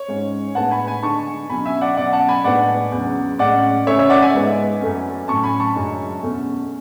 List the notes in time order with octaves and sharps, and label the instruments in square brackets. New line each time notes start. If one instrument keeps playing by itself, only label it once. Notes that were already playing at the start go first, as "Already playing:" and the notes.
Already playing: [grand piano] C#5
G#2 G#3 C#4
A2 G#3 B3 D4 F#5 A5
G#5 B5
G#5 B5
D3 G#3 D4 A5 C#6
B2 F#3 C#4 G#5 B5
E5 G#5
D5 F#5
B2 F#3 C#4 D5 F#5
F#5 A5
G#5 B5
A2 G#3 B3 D4 D5 F#5
E2 C#3 F#3
A2 G#3 C#4 D5 F#5
C#3 E3 A3 C#4 C#5 E5
C#5 E5
D5 F#5
E5 G#5
G#2 G#3 B3
F#2 E3 A3 C#4
A2 F#3 C#4 A5 C#6
G#5 B5
A5 C#6
F#2 C#3 G#3 D4
E2 B2 A3 C#4